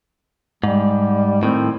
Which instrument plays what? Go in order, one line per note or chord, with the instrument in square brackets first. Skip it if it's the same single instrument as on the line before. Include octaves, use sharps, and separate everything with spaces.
[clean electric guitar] G#2 [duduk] G3
[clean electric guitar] A2 D#3 [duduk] C4